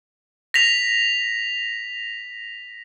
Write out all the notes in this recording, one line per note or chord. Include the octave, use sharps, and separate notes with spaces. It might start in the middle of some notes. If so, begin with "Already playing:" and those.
A#6 B6 F7